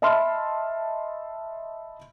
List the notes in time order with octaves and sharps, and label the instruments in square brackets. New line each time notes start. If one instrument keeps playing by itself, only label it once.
[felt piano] D#5 E5 A5 B5 C6 F6